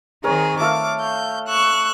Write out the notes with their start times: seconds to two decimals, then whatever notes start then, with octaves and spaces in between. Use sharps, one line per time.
0.24 D#3 C4 G#4 A#4 C#5
0.60 A3 A4 F5 D6
1.01 G6
1.47 C#6 E6 F#6